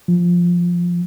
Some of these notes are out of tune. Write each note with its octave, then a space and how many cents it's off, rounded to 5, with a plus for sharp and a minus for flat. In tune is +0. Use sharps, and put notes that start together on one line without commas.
F3 +0